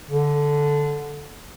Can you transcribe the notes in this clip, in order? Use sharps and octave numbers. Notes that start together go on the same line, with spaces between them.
D3